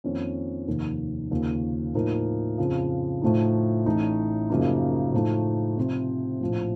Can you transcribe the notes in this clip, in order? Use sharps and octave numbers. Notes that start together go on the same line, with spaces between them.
F2 D#3 A#3 C#4
F1 D#2 D#3
D#2 C#3 F3 A#3
A2 F3 A#3 D#4 A#4
F2 C#3 F3
A2 F3 A3 D#4
A1 A2 A3 D#4
F#2 C#3 F3 A#3 D#4
A2 F3 A3 D#4
C3 F3 C4
A#1 A2 F3